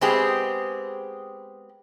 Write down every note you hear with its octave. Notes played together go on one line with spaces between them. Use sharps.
G#3 B3 C4 G4 G#4